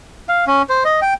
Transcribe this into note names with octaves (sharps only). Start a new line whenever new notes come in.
F5
C#4
C5
D#5
G5